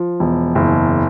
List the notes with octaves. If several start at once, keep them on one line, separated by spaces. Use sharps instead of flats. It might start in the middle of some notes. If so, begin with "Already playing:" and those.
Already playing: F3
E1
F#1